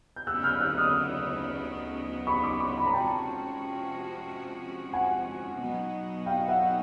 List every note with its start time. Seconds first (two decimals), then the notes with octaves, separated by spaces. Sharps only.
0.16 G6
0.27 D2 C#3 F#3 B3 D#4 E6 F#6
0.43 F6 G6
0.61 E6 F#6
0.77 D#6 F6
2.27 B5 C#6
2.43 C6 D6
2.60 B5 C#6
2.78 B5
2.86 A#5
2.93 C3 F3 G#3 C#4 F#4 G5 A5
4.93 F#5 G#5
5.59 B2 F#3 B3 D#4 F#4
6.26 F5 G5
6.48 E5 F#5